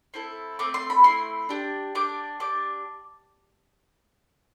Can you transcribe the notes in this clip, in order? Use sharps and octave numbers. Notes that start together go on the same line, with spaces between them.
C4 E4 A4
A3 C4 D6
C6
B5
A3 C4 E4 C6
D4 G4
D4 G4 D6
D4 G4 D6